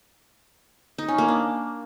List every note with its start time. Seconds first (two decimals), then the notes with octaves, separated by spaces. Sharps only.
0.98 D#4
1.08 C#4
1.18 A#3
1.28 D4